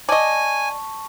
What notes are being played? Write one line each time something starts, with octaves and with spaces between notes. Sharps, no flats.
D5 D#5 G#5 A5 C#6